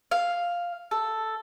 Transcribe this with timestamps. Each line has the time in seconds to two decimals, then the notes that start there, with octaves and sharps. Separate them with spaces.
0.11 F5
0.91 A4